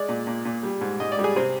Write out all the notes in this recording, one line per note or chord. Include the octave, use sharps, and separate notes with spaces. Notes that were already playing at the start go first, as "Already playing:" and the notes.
Already playing: G#3 D5
A#2
A#2
A#2
G3
G#2
G#2 D#5
D5
G3
G#4
C3 C4